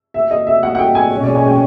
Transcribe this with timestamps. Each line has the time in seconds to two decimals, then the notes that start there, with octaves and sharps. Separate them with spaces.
0.14 E5
0.31 D#5
0.47 E5
0.63 F#5
0.75 F#5
0.79 G5
0.95 G#5
1.11 B2 G#3 C#4
1.23 D5
1.35 G#5
1.47 G5